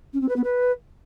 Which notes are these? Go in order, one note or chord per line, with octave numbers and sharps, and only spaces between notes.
C#4
C4
B4
B3
B4